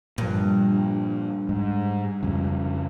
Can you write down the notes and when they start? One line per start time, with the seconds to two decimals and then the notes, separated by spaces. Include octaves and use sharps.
0.18 G2 A#2 F3
1.49 G#2
2.23 F2 C#3